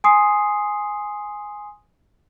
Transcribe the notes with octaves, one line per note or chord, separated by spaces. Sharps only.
G#5 C6 D#6 C7